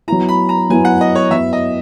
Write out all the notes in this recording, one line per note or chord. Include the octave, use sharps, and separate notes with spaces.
F#3 B3 E4 A#5
B5
A#5
F#3 B3 E4 G#5
F#5
D#5
C#5
F#3 B3 E4 E5
D#5